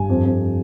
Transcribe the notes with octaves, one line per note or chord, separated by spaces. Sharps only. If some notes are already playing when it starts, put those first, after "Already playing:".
Already playing: G2 G#5
F2
F2